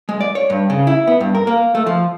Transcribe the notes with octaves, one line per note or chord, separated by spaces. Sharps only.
G#3
D5
C#5
G2
C#3
E4
B3
G2
A#4
A#3
A3
F3